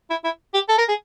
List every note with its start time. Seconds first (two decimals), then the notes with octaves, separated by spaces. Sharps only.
0.10 E4
0.24 E4
0.54 G4
0.69 A4
0.78 A#4
0.89 G#4